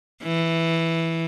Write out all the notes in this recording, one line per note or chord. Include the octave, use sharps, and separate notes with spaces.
E3